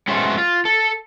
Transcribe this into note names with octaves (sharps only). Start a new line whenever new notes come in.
F#3 G#3 A3 B3 C#4 C5
F4
A4